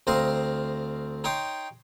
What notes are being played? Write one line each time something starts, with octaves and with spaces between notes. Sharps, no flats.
D2 C4 C5 D#5 F5 A#5
D#4 C#5 G5 C6 D#6